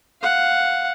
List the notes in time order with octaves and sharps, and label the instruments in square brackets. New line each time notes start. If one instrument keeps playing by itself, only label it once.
[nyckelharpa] F5 F#5